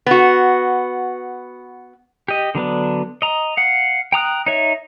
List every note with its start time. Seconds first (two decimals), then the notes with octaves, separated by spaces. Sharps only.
0.06 B3 F#4
2.28 G4 D#5
2.55 D3 F#3 B3 D4
3.22 D#5 A#5
3.57 F5 F#5
4.12 G5 A#5 D#6 F#6
4.46 D#4 C#5 E5